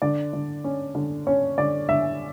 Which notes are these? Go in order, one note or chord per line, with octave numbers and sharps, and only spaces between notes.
D3 D5
D3
C#4
D3
C#4 C#5
D3 D5
D3 E5